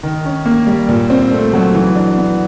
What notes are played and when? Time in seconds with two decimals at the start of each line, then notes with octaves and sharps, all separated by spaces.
0.03 D#3
0.25 C#4
0.46 A#3
0.67 G3
0.89 A#2
1.10 C4
1.31 A3
1.53 F#3
1.75 E3
1.96 D4
2.18 B3